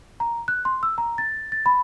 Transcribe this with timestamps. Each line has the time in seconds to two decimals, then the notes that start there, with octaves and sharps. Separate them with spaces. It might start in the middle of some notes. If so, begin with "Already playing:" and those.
0.20 A#5
0.48 F#6
0.65 C6
0.83 E6
0.98 A#5
1.18 A6
1.52 A6
1.66 B5